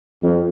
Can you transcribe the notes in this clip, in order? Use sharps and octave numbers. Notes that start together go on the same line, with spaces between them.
F2